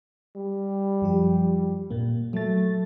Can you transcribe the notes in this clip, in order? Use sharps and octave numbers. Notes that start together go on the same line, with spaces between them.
G3
F#2 F3 G4
A#2 A#3
F#3 A3 A6